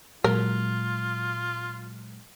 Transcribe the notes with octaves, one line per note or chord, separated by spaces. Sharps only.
A#2 F#3 G#3 F4 A#4